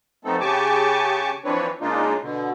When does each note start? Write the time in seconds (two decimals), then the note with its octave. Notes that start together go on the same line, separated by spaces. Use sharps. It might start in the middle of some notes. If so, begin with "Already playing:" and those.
0.25 F3 A3 B3 C4 D#4 A4
0.40 C#3 G4 G#5 A5 C#6 D6
1.45 E3 F3 C4 D4 B4 C#5
1.81 C#3 G#3 A#3 D4 D#4 F4
2.22 B2 D3